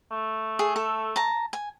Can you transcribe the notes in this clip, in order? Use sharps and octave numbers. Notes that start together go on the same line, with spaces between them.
A3
G#4
A4
A5 A#5
G#5